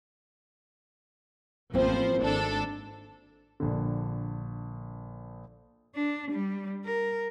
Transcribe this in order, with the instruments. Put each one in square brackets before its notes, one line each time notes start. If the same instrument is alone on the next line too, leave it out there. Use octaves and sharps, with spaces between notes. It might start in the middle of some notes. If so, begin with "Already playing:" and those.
[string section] A1 F3 C5 [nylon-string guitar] A#3 C4 E4
[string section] G#1 D4 A4
[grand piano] A#1 D3
[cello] D4
G3
A#4